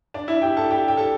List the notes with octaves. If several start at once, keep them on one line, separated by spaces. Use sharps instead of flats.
D4 D5
E4 E5
G4 G5
A4 A5
G4 G5
G5
A4 A5